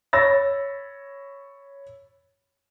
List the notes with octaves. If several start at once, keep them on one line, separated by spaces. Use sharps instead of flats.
C#5 B5 E6 A6 A#6